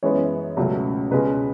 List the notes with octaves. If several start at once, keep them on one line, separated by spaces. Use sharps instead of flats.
F#2 E3 G#3 B3 C#5
C#2 B2 F#3 A3 C#4
C#2 B2 G#3 C#4 B4